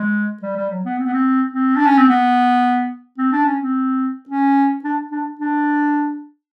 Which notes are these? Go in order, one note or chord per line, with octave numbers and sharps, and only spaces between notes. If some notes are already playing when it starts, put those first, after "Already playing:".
Already playing: G#3
G3
G3
F#3
B3
C4
B3
C4
C4
D4
C#4
C4
B3
C4
D4
C#4
C4
C#4
D4
D4
D4